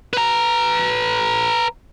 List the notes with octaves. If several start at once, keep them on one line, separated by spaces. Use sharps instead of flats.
B4 A#5